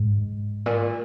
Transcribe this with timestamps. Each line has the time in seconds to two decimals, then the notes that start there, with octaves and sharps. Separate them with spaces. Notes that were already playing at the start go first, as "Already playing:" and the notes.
Already playing: G#2
0.66 A#2